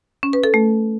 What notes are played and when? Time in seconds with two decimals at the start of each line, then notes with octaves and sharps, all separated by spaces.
0.23 C#4
0.33 B4
0.44 A4
0.54 A3